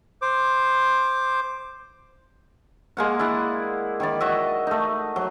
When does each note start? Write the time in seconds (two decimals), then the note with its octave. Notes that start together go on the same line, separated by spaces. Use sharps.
0.22 C5 D6
2.97 G#3 A#3 F#5
3.19 E4 D5 F#5
4.00 D#3 E4 D5
4.21 F#4 D#5 E5
4.67 A3 D#4
5.16 F#3